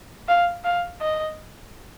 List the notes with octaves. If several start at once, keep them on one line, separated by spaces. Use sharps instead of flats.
F5
F5
D#5